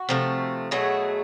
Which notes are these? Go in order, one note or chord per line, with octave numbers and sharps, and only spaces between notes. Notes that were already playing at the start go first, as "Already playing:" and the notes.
Already playing: F#4
C3 F3 A3
B2 F#3 A3 G#4